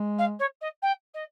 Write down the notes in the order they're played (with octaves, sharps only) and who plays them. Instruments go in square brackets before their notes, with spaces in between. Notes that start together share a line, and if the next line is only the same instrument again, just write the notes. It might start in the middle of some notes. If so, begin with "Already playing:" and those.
Already playing: [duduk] G#3
[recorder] F5
C#5
D#5
G5
D#5